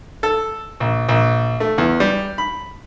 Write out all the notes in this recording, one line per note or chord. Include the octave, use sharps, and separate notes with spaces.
A4
A#1
A#1
A3
E2
G3
B5